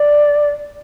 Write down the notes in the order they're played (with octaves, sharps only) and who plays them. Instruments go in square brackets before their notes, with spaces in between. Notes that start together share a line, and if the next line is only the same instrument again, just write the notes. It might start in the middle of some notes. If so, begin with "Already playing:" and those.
Already playing: [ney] D5